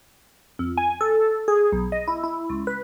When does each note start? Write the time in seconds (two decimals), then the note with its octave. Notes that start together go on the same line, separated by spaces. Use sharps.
0.59 F2
0.77 G#5
1.01 A4
1.48 G#4
1.73 B1
1.92 D#5
2.07 E4
2.24 E4
2.50 C#2
2.67 B4